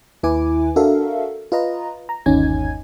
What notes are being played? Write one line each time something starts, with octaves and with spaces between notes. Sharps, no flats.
D#2 E4 B4 G#5 D6
D4 F#4 A4 A#4 E5 F5
F4 B4 D#5 A#5
A#5
G1 D#2 C#4 D#4 G#5 G#6